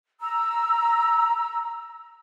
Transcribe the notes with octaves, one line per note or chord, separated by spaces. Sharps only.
A#5 E6